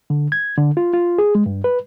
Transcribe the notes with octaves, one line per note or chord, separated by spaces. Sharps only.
D3
G#6
D3
F4
F4
G#4
G#3
G2
B4